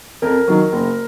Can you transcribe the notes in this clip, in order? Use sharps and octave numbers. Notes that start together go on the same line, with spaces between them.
F2 A#4
D#3 F#3
F#1